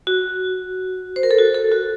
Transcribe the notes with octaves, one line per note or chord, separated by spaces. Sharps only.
F#4
C5
A#4
A4
F#4
A4
F#4